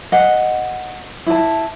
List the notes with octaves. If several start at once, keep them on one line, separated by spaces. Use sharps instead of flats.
D#5 F#5
E4 A5